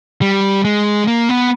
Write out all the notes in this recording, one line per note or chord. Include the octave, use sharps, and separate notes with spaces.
G3
G#3
A#3
B3